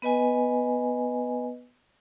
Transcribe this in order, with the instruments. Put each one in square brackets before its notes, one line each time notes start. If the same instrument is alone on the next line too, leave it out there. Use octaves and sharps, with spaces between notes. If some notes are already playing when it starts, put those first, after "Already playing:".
[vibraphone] B3 B4 D#5 G#5